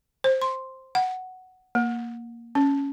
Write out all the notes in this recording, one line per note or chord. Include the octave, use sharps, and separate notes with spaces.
C5
C6
F#5
A#3
C#4